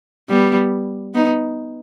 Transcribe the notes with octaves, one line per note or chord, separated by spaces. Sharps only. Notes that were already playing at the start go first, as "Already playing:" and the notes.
G3 B3
B3 D#4